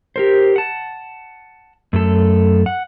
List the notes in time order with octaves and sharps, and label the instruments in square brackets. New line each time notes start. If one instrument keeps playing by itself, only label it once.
[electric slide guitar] G4 A#4 C5
F#5 A5
F#2 A3 A4
F#5